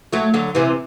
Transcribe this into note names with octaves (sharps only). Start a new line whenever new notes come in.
F#3 A3
D3 F#3
C3 E3